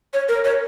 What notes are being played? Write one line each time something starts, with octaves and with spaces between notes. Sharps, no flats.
C#5
A#4
C#5